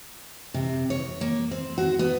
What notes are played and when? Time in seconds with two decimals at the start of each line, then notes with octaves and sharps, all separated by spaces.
0.54 C3
0.90 C#5
1.21 A#3
1.51 C4
1.78 F#4
1.99 B3